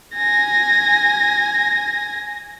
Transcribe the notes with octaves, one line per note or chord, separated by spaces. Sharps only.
G#5 A#6